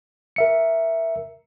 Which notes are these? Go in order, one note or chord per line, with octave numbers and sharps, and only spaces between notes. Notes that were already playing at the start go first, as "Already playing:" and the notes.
A#4 E5 C#7